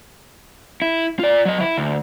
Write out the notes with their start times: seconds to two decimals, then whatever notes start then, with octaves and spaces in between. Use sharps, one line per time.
0.82 E4
1.19 F4 D5
1.45 F#3 D#5
1.60 E4
1.78 D2